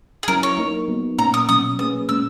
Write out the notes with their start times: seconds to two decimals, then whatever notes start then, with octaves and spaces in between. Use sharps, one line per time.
0.23 G#4
0.28 F#3 C#4 E4 A#4
0.43 C#5
0.58 A#3 D#4 A#4
0.88 F#3 B3 D#4
1.18 A#2 A#3 C#4 A#5
1.34 D#6
1.49 B2 F#3 C#4 D#6
1.79 A#3 C#4 G#4 B4 D#6
2.09 A#2 G#3 C#4 E6